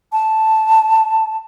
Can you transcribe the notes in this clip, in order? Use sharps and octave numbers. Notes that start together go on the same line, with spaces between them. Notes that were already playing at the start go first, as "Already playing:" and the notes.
A5